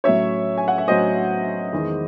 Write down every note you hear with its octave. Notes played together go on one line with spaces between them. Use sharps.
A2 F#3 C#4 C#5 E5
G#5
F#5
E5
A2 F#3 C#4 C5 D#5
E2 D#3 G#3